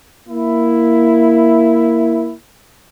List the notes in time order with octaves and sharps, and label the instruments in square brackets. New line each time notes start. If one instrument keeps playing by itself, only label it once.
[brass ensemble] A#3 E4